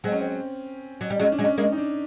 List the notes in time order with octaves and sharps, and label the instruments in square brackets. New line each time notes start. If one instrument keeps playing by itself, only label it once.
[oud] F#3 G#3 [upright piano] C4
[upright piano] C#4
C4
[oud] F#3
G3
[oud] F#3 G#3 [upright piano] C#4
[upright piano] D4
[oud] F#3 G#3
[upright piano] C#4
[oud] G#3 A#3
[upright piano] D#4
D4